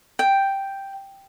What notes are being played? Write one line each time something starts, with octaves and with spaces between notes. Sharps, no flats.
G5